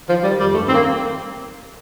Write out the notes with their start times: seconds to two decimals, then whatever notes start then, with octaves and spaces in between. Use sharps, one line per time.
0.09 D#3 F3
0.23 D#3 G3
0.39 F2 G3
0.54 G2 A3
0.68 D#3 C4
0.74 A#3